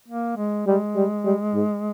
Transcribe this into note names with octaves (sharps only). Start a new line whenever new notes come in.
A#3
G#3
G3 G#3
G3
G3
G#2